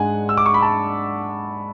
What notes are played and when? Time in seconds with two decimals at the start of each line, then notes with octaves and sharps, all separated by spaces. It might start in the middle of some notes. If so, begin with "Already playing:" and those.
Already playing: G#2 G#3 D4 F#5 G#5
0.29 E6
0.37 D6
0.46 C#6
0.54 B5
0.62 A5